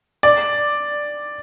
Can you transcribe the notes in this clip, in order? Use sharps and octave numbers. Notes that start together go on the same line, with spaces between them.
D5